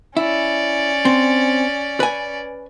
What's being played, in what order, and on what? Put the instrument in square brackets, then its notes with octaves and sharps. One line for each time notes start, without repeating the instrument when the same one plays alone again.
[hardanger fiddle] C#4 D5 [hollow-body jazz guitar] E4
[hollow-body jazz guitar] C4
B4 G#5